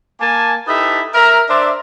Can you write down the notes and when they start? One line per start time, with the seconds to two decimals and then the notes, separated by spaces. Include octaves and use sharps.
0.20 A#3 G#5 A5
0.67 D#4 E4 G4 A4 B4 E5
1.14 A#4 E5 A#5
1.49 D4 C5 D5 E5